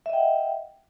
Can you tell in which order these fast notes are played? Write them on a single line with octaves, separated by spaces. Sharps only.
E5 D#5 G5 F#5